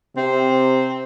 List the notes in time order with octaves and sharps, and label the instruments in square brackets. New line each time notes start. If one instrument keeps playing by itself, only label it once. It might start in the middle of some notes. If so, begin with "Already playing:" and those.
[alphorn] C3 [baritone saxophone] C4